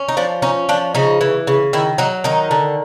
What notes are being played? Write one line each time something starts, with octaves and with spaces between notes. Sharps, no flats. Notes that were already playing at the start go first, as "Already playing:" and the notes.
Already playing: C#4
D#4
F3 D4
C#4 D#4
F3 D4
C#3 D#4
E3
C#3
D#3 E4
F#3 D#4
D#3 D#4
D3